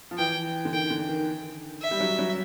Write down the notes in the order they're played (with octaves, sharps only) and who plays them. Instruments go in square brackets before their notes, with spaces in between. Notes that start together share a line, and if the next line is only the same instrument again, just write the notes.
[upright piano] F3
[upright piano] E3 [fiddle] G5
[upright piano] D3
[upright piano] D#3 [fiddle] G5
[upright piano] D3
D#3
[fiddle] E5
[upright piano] G3
F#3
F#3